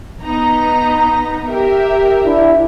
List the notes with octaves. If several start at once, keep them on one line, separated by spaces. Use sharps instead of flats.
B3 D#4 A#5
G4 A#4 E5
D4 E4